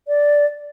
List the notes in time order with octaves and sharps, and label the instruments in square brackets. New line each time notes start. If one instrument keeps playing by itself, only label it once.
[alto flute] D5